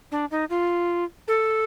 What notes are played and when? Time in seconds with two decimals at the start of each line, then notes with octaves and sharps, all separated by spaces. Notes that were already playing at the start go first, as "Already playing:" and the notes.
0.12 D4
0.31 D#4
0.50 F4
1.28 A4